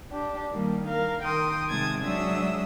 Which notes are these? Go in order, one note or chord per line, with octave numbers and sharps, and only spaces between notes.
D4 G4
D#3 G3 A#3
A#4 F5
D#3 A#4 G5 C6 D#6
C3 D#3 G#3 A5 D#6 G#6
F#3 G#3 D4 E5 D#6 E6